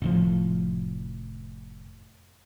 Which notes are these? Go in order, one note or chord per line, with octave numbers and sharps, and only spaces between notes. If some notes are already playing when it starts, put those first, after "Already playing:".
F1 A2 F3